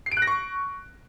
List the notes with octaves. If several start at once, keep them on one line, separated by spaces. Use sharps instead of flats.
C7
D7
F#6
A#6
C#6